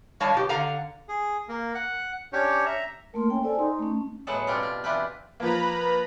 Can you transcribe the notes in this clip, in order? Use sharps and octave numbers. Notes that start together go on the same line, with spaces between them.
G3 D4 C#5 D#5 F5 A5
B2 G4
D3 F5 F#5 A#5
G#4
A#3
F#5
C#4 D4 G4 C#5
E5 A#5
A3 A#3 A#4 C6
C#4 G5
A4 C5 D5 G#5
D#4 C6
A3 C#4
A2 F#3 G#3 B3 F#5 A5
B2 C4 D4 F4 G4
F4
E3 D4 E4 F4 G4 B4
F3 A#3 B4 A#5 B5